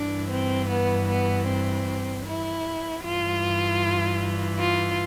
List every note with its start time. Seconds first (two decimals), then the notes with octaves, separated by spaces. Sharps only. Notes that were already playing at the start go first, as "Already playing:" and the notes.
Already playing: G2 E3 D4
0.30 C4
0.69 B3
1.08 B3
1.47 C4
2.25 E4
3.03 G2 E3 F4
4.59 F4